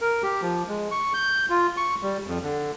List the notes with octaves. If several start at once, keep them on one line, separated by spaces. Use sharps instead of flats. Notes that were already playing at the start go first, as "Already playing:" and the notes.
A#4
G4
F3
G#3
C#6
G6
F4
C#6
G3
F2
D3